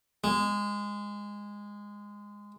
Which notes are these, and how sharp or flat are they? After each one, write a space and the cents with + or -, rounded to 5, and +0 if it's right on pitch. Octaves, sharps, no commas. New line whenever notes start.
G#3 -15